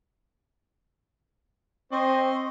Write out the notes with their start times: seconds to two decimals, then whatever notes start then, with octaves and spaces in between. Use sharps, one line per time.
1.92 C4 C5 D#5 C#6